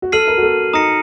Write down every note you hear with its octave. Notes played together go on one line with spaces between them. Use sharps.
F#4
A4 F6 C7 D#7 F#7
A#4
F#4
A4
D#4 A#5 D#6 A#6 C#7